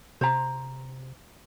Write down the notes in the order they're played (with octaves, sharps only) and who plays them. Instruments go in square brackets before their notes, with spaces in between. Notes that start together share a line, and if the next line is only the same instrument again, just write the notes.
[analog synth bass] C3 [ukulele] C5 A#5